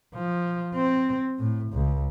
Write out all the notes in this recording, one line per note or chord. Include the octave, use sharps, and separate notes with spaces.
F3
C4
A2
C#2